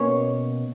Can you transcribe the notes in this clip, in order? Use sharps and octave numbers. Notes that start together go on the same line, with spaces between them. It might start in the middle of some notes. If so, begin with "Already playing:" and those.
Already playing: B2 A#3 C#4 C#5